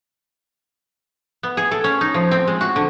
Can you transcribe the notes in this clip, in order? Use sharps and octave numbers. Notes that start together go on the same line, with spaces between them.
B3
G#4
A4
C#4
D#4
F3
C4
G#3
F#4
D3